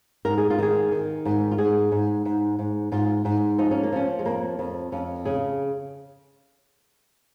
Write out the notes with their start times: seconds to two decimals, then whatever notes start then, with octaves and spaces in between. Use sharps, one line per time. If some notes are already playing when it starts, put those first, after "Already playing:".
0.25 G#2 A#4
0.38 G#4
0.50 F4
0.59 D#3 G#4
0.92 D#3
1.25 G#2
1.52 F4
1.58 G#2 G#4
1.92 G#2
2.25 G#2
2.59 G#2
2.92 G#2 F4
3.25 G#2
3.58 F3 D#4
3.71 C#4
3.83 A#3
3.92 F3 C#4
4.19 G#3
4.25 F2 A#3
4.59 F2
4.92 F2 C#4
5.25 C#3 G#4